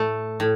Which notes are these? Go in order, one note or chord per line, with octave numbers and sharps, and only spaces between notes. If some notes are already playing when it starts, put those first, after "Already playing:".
Already playing: A2 A3
A2